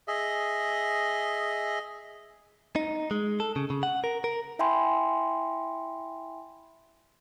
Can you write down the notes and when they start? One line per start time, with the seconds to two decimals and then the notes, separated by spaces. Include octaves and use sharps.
0.08 G#4 D#5 E5
2.76 D#4
3.11 G#3
3.40 A4
3.56 C#3
3.70 C#3
3.83 F#5
4.04 A#4
4.24 A#4
4.59 E4 E5 G5 G#5 B5 C6